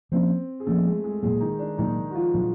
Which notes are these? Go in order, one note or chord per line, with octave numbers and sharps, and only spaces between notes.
F3 A#3 C4 C#4 C5
G#4
F3 A3 A#3 C#4 A4
G#3 G#4
G#3 G#4
A#2 F#3 G#3 A#3 G#4
D#3 D#4
D4
A#2 D#3 F#3 A#3 D#4
F#4
F3 F4
A#2 F#3 B3 D4